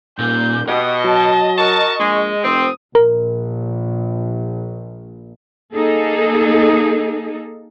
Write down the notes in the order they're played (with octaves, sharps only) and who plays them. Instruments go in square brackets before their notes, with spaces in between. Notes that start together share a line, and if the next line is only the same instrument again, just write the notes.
[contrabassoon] D#1 [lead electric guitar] A#2 [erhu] G6
[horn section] B2 [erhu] G4 [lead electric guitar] D#5
[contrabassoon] F#3 [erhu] A5
[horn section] F#4 A#4 A5 [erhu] C#6
[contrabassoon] A#1 [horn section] G#3
[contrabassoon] F1 [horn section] C4 [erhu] D#6
[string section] A#1 [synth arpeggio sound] A#4
[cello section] A#3 D#4 G#4 A4